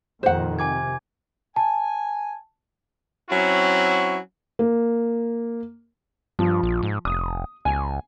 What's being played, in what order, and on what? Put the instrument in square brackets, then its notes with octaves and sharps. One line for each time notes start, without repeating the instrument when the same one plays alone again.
[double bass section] F2 A#2 D#3 [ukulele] C5 F#5
[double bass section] C3 [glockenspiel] G#5 D6 G#6
[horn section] G#5 [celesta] A5
[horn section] F#3 C4 C#4 E4 F#4
[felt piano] A#3
[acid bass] G2 [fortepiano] F3
[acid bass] A#1
G#2
[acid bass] F1 [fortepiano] D#6
[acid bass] C#2 [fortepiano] G#5